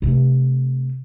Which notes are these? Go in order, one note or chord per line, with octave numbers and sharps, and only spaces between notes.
C3 A3